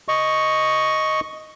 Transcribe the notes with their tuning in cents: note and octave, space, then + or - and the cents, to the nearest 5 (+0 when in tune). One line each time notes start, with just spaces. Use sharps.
D#5 +0 C#6 +0